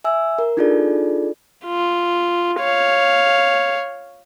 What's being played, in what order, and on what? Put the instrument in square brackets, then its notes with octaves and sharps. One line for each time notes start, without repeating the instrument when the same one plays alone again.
[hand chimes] E5 G#5 E6
A#4
D4 D#4 F4 G#4 A4 D5
[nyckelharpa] F4
C#5 F5